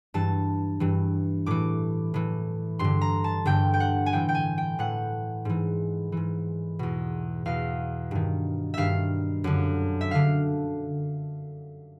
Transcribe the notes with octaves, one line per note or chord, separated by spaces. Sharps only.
G2 E3 A5
G2 E3
A2 E3 D6
A2 E3
G2 D3 C6
A#5
A5
G2 D3 G5
G5
F#5
G#5
A2 E3 G5
G5
G#5
G5
A2 E3 F#5
G#2 E3
G#2 E3
E2 B2
E2 B2 F5
G2 D#3
G2 D#3 E5 F5
F#2 D3
E5
D3 F5